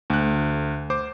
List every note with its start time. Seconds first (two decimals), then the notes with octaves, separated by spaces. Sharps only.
0.10 D2 F#6
0.90 C5 D6